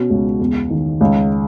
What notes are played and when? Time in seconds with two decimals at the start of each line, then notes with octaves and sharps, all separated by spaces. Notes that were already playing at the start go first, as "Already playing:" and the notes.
Already playing: B2 C#4
0.10 C#2
0.39 E2
0.70 D#3
1.01 C#2